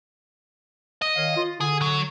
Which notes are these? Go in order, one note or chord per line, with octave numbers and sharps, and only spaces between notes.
D#5
D#3 C#5 F5
F4
D3 G#4
F#3